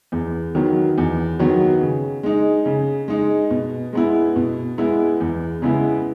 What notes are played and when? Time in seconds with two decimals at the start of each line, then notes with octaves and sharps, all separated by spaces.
0.12 E2
0.55 D#3 F#3 B3
0.98 E2
1.39 D#3 F#3 B3
1.81 C#3
2.23 G#3 D#4
2.66 C#3
3.08 G#3 D#4
3.51 B2
3.93 G#3 B3 E4
4.36 B2
4.78 G#3 B3 E4
5.20 E2
5.62 C#3 G#3 B3 E4